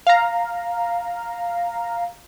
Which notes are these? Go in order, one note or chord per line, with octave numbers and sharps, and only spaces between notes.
F5 A#5